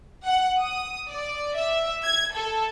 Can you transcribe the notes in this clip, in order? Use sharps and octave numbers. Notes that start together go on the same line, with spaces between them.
F#5
D#6
D5
E5
G#6
A4